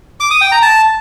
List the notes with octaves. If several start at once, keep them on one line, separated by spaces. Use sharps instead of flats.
D6
D#6
G5
A#5
A5